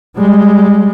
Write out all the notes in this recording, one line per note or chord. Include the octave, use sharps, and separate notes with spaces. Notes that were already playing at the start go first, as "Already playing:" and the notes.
G3 G#3